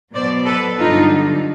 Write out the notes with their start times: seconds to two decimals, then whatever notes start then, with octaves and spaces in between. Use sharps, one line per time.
0.14 B2 F#3 B3 C5 D5
0.46 A4 B4
0.79 G2 D3 F#3 D#4 F4